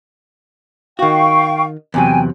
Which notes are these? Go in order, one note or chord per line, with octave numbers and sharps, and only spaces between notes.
D#3 F#4 F5 G5 C#6
E2 C3 F#3 G5 G#5